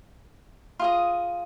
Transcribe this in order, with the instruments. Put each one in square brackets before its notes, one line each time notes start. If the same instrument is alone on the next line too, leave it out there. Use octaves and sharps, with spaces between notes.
[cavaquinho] F4 G#4 D#5